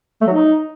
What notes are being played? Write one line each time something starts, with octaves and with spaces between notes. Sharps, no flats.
A3
F#3
D#4